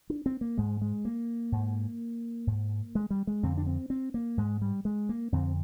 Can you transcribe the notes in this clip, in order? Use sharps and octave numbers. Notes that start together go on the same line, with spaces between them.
D4
C4
A#3
G#2 G#3
G#3
A#3
G#2
G#2
G#3
G3
G#3
F2 D3 C4
D4
C4
C4
A#3
G#2 G#3
G3
G#3
A#3
F2 D3 C4